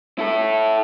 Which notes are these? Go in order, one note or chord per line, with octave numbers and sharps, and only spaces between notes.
E4 A4